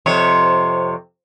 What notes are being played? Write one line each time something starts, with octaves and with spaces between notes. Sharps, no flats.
F2 C3 C#5